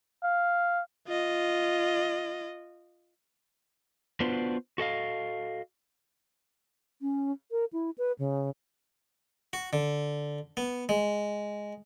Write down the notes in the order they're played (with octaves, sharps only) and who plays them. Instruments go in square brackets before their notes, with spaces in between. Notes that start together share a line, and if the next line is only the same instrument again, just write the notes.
[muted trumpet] F5
[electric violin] F4 D#5
[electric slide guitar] B3 D4 F4 F#4 B4 C5
F#4 A4 D#5 F5
[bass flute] C#4
A#4
E4
B4
C#3
[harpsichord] F#4
D3
B3
G#3